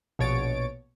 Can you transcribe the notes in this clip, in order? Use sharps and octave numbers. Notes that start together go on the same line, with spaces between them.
A#1 B2 C#5 A6 D7